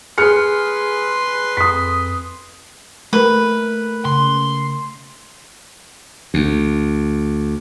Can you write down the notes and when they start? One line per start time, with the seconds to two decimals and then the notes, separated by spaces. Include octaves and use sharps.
0.18 G#4 B4 C6 F6 C#7
1.57 F2 D#6 B6
3.13 A3 A#4 B4
4.05 C#3 C6
6.34 D2